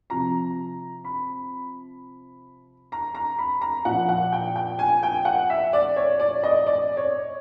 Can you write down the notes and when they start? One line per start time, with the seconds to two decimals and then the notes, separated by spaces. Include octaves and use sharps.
0.10 C3 F3 A#5
1.04 B5
2.92 A#5
3.15 A#5
3.38 B5
3.61 A#5
3.85 A#2 F3 F#5
4.09 F#5
4.32 G5
4.56 G5
4.79 G#5
5.03 G5
5.25 F#5
5.50 E5
5.73 D5
5.96 C#5
6.20 D5
6.43 D#5
6.66 D5
6.97 C#5